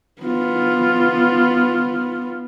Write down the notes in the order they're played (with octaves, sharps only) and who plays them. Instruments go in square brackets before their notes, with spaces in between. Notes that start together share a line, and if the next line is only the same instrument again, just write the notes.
[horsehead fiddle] B3 F4